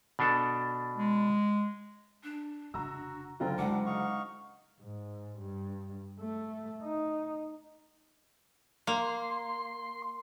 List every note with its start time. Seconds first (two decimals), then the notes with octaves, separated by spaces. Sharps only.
0.19 B2 D4 A4
0.96 G#3
2.23 D4
2.74 F1 C#3 F#4 A#5 E6
3.40 F#1 D3 C4 F4 A#5
3.59 G#3 D4 F#5 D6
3.86 D#4 F5 C#6
4.80 G#2
5.38 G2
6.20 A3
6.83 D#4
8.87 A#3 C6